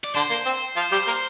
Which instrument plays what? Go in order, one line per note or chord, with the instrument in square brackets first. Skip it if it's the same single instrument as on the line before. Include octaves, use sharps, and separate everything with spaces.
[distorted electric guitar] D5
[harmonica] D3 D4 [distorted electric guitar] C5
[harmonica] A#3
C4
F3 F4
G3 G4
A#3 A#4